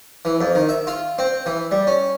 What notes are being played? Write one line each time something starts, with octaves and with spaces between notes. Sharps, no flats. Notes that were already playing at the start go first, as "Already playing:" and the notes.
E3
F2
D#3
E5
F4
C4
E3
G3
C#4